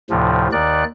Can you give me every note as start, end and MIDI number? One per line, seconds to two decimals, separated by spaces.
0.10 0.48 38
0.10 0.48 45
0.10 0.48 48
0.10 0.48 53
0.52 0.84 39
0.52 0.84 51
0.52 0.84 74
0.52 0.84 90